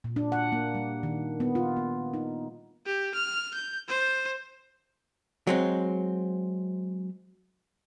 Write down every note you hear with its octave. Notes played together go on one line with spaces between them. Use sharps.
A#2
D4
F#5
A#3
G3
D#3
B3
F4
A#3
D#4
G4
F6
G6
C5
F#3 G#3 C4